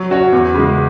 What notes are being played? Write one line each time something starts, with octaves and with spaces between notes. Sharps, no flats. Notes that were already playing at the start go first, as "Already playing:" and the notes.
Already playing: F#3
C#4 F#4 C#5
E2
C#3 G#3